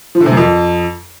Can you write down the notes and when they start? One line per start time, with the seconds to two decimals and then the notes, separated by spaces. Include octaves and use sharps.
0.15 F3
0.20 D3
0.26 C3
0.32 F#2
0.37 F2